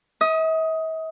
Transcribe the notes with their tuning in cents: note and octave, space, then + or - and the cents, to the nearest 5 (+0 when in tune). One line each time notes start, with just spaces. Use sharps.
E5 -45 D#6 +15